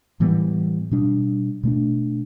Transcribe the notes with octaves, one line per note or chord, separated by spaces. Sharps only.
A2 E3 G3 B3
B2 G3 D4
B2 A3 D4